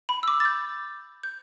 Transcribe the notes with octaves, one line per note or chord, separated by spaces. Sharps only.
B5
E6
D6
A6
G6
G6